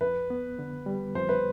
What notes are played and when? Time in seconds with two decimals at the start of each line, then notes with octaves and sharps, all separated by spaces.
0.01 F2 B4
0.30 B3
0.59 D3
0.86 G3
1.15 F2 C5
1.29 B4